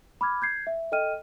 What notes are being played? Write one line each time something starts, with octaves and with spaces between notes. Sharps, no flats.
B5 D6 F6 G#6
G6 G#6 C7
E5
A4 D#5 G5 F6 D#7